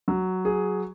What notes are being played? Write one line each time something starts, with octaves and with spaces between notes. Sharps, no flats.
F#3
G#4